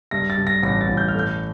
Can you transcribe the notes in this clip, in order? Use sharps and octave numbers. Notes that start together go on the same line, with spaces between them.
G2 A#6
A6
G2
A#6
A1 A#6
A6
A1
G6
F6
A3
G6